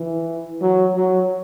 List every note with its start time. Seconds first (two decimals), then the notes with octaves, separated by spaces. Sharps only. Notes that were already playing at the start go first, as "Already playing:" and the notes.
Already playing: E3
0.61 F#3
0.95 F#3